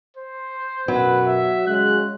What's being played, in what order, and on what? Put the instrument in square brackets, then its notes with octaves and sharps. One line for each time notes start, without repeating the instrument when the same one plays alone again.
[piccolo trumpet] C5
[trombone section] F#2 B2 [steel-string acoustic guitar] F#3 [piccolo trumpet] B4
[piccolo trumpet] E5
[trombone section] C#3 G#3 [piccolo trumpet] F#6